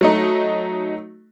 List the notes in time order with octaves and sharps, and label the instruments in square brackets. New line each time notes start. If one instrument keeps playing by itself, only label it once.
[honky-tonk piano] F#3 A3 D#4